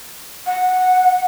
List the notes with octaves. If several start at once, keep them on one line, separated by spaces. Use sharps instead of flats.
F#5